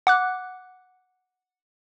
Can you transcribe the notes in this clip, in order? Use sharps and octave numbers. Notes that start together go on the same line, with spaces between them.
F#5 D6 F#6